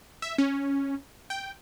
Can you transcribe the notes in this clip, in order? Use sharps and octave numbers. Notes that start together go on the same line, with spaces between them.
E5
C#4
G5